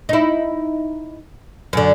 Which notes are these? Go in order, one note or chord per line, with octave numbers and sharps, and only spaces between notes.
D#4 E4
F#2 D3